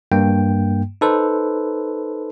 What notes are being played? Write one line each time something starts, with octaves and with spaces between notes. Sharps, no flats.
G2 A#3 G5
D#4 A4 B4 C5